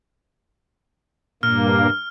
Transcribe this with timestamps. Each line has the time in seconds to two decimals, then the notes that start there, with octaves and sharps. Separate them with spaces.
1.43 G2 A#2 A#3 F6